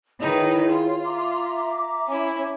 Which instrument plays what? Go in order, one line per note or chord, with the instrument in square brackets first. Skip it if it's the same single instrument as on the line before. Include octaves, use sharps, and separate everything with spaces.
[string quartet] D#3 D#4 B4 [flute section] E4 G#4 C#5
[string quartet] F4
[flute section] E5 A#5 D6
[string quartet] C#4 E4